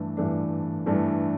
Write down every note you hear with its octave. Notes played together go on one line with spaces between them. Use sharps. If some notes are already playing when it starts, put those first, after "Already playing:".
Already playing: G2 E3 A3 D4
G2 E3 A3 D4
G2 E3 A3 D4